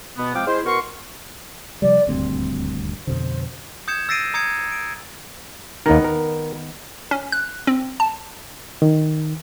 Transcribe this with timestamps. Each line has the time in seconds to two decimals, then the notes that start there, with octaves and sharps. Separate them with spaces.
0.17 B2 B3
0.34 F3 G#3 C4 F5 G5 D6
0.47 G#3 E4 G#4 C5
0.65 B2 A#4 F#5 C6 C#6
1.82 C3 F3 G3 D5
2.07 D#1 D2 G2 C4
3.07 F2 B2 D3 C5
3.88 D#6 G6 G#6 C#7 E7
4.09 E6 A6 A#6 C7 D7 D#7
4.34 A#5 D#6 G#6 C#7
4.72 D7
5.86 D#2 D#3 B3 A#4
6.04 A#4
7.11 C#4
7.32 F#6
7.67 C4
8.00 A5
8.82 D#3